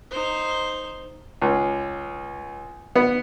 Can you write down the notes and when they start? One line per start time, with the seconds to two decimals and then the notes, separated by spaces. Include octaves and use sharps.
0.11 D#4 C5
1.42 C#2
2.96 B3